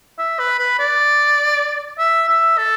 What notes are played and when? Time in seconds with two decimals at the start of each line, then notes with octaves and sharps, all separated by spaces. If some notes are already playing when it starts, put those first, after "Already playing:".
0.19 E5
0.39 B4
0.58 B4
0.79 D5
1.98 E5
2.29 E5
2.58 A4